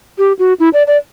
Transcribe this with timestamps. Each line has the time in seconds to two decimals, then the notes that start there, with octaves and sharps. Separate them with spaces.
0.18 G4
0.39 F#4
0.60 E4
0.73 D5
0.87 D5